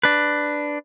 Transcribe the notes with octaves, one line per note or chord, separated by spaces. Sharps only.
D4 B4